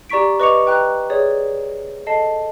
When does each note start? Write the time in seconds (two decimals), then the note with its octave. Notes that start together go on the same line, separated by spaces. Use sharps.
0.10 G4 D5 A#5 C#6 B6 D7
0.40 B4 D#5 C#6 D6 C#7 F7
0.67 B4 G5 A#5 F#6
1.10 G#4 C#5 D5
2.07 A4 D#5 A5 C7